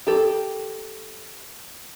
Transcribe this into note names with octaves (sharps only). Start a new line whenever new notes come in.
G4 A4